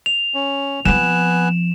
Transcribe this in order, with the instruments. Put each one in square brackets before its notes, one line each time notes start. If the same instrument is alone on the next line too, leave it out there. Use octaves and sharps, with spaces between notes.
[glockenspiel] F7
[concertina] C#4
[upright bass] F3 C4 [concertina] B3 G#5 F#6 [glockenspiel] E7